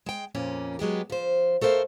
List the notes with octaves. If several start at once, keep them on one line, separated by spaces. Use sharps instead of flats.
G#3 G5
F2 A#2 A#3 C#4
F#3 G#3 B3 G4
F3 C5
A3 A4 A#4 C5 F5